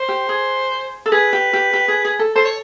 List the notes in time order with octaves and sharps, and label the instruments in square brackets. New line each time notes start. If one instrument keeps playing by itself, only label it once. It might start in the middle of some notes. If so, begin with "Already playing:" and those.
Already playing: [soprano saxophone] C5
[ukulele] G4
G#4
A4
[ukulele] G#4 [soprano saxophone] B4
[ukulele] G4
G4
G4
G#4
G#4
A4
[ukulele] A4 [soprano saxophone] C5
[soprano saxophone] C#5